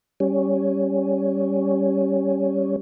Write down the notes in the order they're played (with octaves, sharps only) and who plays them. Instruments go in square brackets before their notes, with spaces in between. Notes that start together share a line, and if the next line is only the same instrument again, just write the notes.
[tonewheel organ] G3 C#4